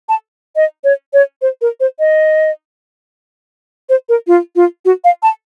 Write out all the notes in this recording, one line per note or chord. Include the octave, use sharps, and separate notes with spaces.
A5
D#5
C#5
C#5
C5
A#4
C5
D#5
C5
A#4
F4
F4
F#4
F5
A5